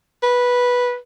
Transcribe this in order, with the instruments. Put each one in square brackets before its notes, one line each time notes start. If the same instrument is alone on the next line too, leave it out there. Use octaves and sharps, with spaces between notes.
[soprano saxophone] B4